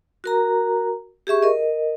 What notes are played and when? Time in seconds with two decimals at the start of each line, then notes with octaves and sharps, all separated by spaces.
0.24 F#4 A#4 A#5
1.27 G4 G#4 E5 C#6
1.42 A#4 D#5